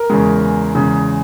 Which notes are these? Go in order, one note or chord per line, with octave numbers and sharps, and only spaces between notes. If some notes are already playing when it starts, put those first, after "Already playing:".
Already playing: A#4
E2 C#3 G#3
E2 C#3 G#3